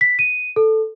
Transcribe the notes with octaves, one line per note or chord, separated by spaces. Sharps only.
B6
D#7
A4